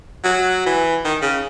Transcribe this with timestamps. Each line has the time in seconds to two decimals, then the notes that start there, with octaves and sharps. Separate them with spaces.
0.24 F#3
0.66 E3
1.05 D#3
1.22 C#3